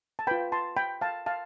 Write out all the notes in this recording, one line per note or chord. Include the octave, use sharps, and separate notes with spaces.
A5
F4 B4 G5 B5
A5 C6
G5 B5
F5 A5
F5 A5